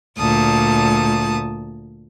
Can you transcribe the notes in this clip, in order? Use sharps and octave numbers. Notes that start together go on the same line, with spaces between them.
D2 A#2 A5 D#6